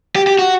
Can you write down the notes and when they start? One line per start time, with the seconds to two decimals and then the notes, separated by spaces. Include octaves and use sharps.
0.16 G4
0.27 G4
0.39 F#4